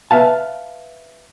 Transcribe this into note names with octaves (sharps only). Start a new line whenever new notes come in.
B4 E5 F5 A5